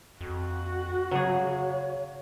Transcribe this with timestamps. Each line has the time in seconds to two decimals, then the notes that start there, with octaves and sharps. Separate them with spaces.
0.21 F2 F#4
1.11 C#3 F#3 G#4 C#5